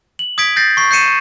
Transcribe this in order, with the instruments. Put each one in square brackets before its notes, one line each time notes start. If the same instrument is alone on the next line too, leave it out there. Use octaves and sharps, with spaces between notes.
[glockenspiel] F#7
D#6 G#6 B6 D7
G6 A6 A#6 C7
C#6 C7
G6 C7 C#7 D#7 E7